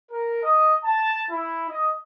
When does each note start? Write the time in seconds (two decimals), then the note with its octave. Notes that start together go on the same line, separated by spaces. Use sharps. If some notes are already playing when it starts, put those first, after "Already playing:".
0.11 A#4
0.44 D#5
0.84 A5
1.30 E4
1.69 D#5